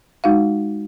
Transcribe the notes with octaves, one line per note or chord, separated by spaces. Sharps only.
G#3 D#4 F#4 F5